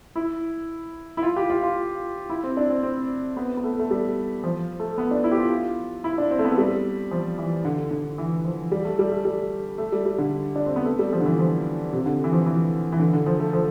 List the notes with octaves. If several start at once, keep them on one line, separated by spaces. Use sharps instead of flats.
E4
E4
F4
G4
F4
F4
E4
C4
D4
C4
C4
B3
B3
A3
A3
G3
F3
A3
B3
D4
E4
G4
F4
E4
D4
C4
A3
B3
A3
G3
F3
E3
D3
D3
E3
F3
G3
A3
G3
A3
G3
A3
G3
G3
D3
D4
C4
B3
A3
G3
F3
D3
E3
F3
C3
D3
E3
F3
E3
E3
D3
D3
F3
A3
F3